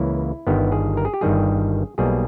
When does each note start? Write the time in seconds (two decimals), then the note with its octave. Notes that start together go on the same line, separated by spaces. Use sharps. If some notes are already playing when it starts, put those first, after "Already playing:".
Already playing: C#2 C#3 E3 A#3 E4
0.47 G1 G2 D#3 G3 B3
0.72 G#4
0.97 A#4
1.05 G#4
1.14 G4
1.21 G1 G2 D#3 G3 G#4
1.98 B1 B2 G3 A#3 G#4